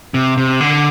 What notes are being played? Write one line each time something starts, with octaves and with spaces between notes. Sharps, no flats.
C3
C3
D3